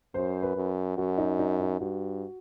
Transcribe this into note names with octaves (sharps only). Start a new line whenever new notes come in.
F#2 C5
B4
F#2
F#2 F#4
D#4
D#4
D#4
G2 F#4